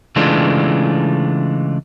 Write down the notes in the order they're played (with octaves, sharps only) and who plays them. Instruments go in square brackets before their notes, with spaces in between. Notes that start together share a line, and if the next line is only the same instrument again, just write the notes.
[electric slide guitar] C#3 E3 G#3 A3 D4 F4